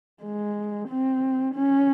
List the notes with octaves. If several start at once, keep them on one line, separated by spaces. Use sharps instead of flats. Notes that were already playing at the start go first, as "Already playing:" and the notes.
G#3
C4
C#4